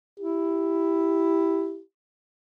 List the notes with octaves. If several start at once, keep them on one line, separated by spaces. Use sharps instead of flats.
E4 G4